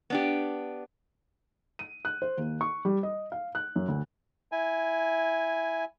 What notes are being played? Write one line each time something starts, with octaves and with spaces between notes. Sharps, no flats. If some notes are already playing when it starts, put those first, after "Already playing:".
B3 D4 G4
D#7
F#6
C5
D#2
C#6
G3
D#5
F5
F#6
F#2
D2
E4 G#5